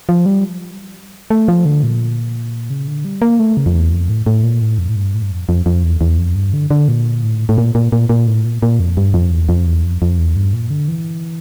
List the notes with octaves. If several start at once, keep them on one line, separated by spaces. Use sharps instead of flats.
F3
G3
A3
F3
D3
A#2
C#3
D3
G3
A#3
A3
C#3
F2
E2
F2
A2
A2
A#2
A2
F2
A2
G2
A2
G2
F2
F2
F2
E2
E2
F2
G2
D3
D3
A#2
A2
A2
A#2
A#2
A#2
A#2
A2
A#2
A#2
F2
G2
F2
E2
F2
E2
F2
F2
E2
G2
A#2
D3
E3